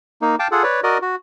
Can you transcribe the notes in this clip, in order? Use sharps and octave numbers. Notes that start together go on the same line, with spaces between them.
A#3 D#4
F5 G5 A5 D6
F4 G#4 A4 F#5
B4 C#5 D5
F#4 A#4 D5 D#5
F#4